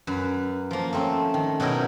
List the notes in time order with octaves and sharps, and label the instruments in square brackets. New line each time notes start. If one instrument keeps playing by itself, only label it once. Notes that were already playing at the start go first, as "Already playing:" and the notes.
[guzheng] F#2 B4
F3 A#3
A3 C4 C#4
D#3
B2 F#3 C#4 D#4 E4 A#4